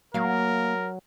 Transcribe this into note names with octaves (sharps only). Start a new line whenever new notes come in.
F#3 A#3 A#4 F5